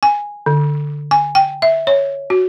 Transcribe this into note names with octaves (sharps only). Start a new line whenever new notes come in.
G#5
D3
G#5
G5
E5
C#5
F#4